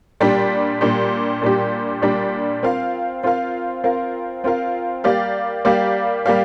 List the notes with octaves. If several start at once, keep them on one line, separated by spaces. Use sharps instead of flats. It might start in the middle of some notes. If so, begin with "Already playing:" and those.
A#2 G3 D4 G4
A#2 G3 D4 G4
A#2 G3 D4 G4
A#2 G3 D4 G4
C4 F4 A#4 F5
C4 F4 A#4 F5
C4 F4 A#4 F5
C4 F4 A#4 F5
G3 A#3 G4 D5 F5
G3 A#3 G4 D5 F5
G3 A#3 G4 D5 F5